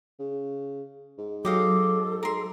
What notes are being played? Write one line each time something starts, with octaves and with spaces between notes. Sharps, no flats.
C#3
G#2
F#3 G4 A4 D#5 F5
G#2 A#4 C6